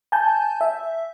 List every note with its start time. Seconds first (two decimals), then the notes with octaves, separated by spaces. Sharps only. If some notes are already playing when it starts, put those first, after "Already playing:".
0.12 G#5 A5 G6
0.61 E5